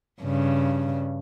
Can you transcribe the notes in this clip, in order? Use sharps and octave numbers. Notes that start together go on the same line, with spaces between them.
G2 C#3